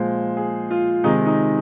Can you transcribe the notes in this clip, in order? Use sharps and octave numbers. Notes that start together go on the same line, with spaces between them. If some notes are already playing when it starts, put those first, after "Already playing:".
Already playing: A#2 F3 G#3 C5
G#4
F4
C3 D#3 G#3 D#4
D#4